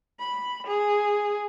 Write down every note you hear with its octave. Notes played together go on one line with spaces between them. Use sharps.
B5
G#4